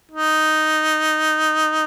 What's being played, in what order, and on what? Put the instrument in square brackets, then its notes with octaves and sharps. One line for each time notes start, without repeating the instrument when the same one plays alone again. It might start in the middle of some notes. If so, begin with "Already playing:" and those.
[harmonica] D#4